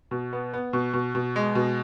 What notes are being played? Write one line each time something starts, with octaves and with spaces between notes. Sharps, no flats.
B2
B3
B3
B2
B2
B2
G#3
B2